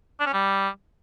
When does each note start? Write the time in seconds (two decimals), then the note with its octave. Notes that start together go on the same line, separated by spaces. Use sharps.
0.20 D4
0.27 C#4
0.33 G3